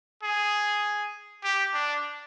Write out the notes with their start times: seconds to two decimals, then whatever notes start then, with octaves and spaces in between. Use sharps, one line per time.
0.23 G#4
1.43 G4
1.74 D4